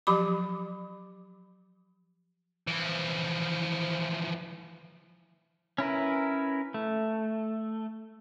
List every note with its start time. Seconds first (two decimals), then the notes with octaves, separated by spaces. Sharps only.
0.07 F3 F#3 G4 B5 D6
2.68 E3 F3
5.78 C#4 E4 A#4 B4
6.74 A3